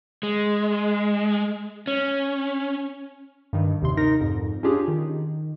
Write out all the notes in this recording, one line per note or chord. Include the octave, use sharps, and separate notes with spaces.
G#3
C#4
G2 D#3
D#2 C3 C6
D#4 A#4 A#6
F2 G#2
C#4 D4 F4 G4 G#4
D#3